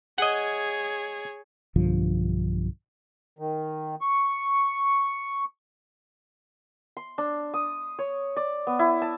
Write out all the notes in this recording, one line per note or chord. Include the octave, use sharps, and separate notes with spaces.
G#4 C#5 D#5 F#5
B1 G2 D3 F3
D#3
C#6
C6
D4
D#6
C#5
D5
B3
E4
A5